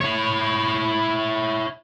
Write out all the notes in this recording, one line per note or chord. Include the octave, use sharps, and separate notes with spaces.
E4 C#5